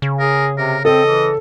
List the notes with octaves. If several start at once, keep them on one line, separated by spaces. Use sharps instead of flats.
C#3
G#4 A#4
C3 A#4
C4 A4 D#5
E3